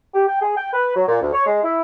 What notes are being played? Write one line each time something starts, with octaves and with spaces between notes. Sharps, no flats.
G4
G5
G#4
G5
B4
F#3
A#2
D2
C#5
G#3
E4